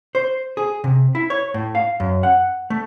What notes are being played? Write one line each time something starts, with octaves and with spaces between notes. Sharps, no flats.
C5
G#4
C3
E4
C#5
A2
F5
F#2
F#5
A3